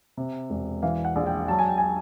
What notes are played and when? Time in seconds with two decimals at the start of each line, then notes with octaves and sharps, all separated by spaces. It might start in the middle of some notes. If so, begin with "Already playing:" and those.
0.17 C3
0.50 E1
0.83 E3 F5
1.05 F#5
1.16 A#1
1.27 G5
1.48 F#3 A5
1.59 G#5
1.68 G5
1.78 G#5